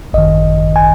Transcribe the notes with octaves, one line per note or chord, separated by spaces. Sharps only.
G#1 F#2 D#3 D#5
G#5